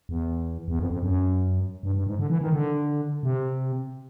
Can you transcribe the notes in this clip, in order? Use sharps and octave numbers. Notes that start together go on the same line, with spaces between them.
E2
E2
F2
F2
F#2
G2
G2
G#2
D3
E3
D#3
D3
C3